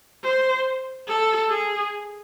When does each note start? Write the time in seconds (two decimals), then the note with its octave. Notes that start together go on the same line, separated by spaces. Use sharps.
0.23 C5
1.07 A4
1.49 G#4